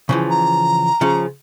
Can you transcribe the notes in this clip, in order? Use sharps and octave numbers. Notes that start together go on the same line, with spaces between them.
C#3 E3 F3
A#5
C#3 F3 C#4